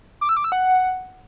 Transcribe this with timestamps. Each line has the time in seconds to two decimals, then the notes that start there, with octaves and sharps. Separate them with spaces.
0.21 D6
0.29 E6
0.37 D6
0.44 E6
0.52 F#5